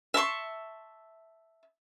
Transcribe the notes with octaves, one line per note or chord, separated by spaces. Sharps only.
E5 A5 C6 C#6